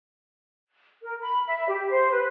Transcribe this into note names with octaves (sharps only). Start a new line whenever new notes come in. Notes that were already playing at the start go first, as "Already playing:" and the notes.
A#4
B5
E5
G4
C5
B4